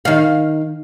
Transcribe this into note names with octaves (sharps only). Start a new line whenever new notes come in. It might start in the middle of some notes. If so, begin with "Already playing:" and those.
D#3 F5